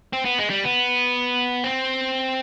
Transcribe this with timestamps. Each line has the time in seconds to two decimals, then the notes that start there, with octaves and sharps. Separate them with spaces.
0.13 C4
0.25 B3
0.39 G#3
0.50 G3
0.64 B3
1.64 C4